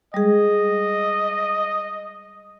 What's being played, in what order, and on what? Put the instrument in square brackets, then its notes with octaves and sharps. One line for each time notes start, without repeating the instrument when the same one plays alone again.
[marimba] G3 G#3 G#4 [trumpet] D#5